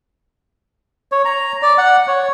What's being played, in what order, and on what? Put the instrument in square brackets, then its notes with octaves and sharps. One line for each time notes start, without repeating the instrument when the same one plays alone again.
[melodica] C#5
A#5
D5
F#5
C#5